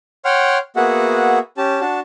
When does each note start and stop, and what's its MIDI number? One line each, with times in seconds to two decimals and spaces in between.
0.25 0.58 73
0.25 0.58 78
0.25 0.58 79
0.25 0.58 84
0.25 0.58 89
0.76 1.39 58
0.76 1.39 59
0.76 1.39 66
0.76 1.39 68
0.76 1.39 76
0.76 1.39 78
1.57 1.81 61
1.57 1.81 67
1.57 1.81 81
1.81 2.00 62
1.81 2.00 66
1.81 2.00 81